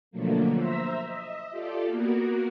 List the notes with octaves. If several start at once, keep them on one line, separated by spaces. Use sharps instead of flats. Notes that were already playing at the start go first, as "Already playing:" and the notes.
B2 D3 F3 F#3 A3 A#3
C5 E5 A#5 E6 B6
D#5 E5
F4 G4 A4 D5
A#3 B3 F#4 A#4